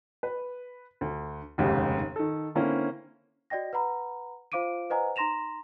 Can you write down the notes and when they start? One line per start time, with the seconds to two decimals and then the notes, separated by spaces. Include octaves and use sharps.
0.23 B4
1.01 D2
1.58 F1 D#2 G#2 C#3 G4
2.16 D#3 A4
2.55 D3 A#3 C4 C#4 E4
3.50 F#4 D5 D#5 G5 A#6
3.73 B4 F#5 A#5 B5
4.52 F4 C5 F5 D6 D7 D#7
4.90 B4 C5 D#5 F#5 G#5 A#5
5.16 D#4 A#5 C6 A#6 E7 F7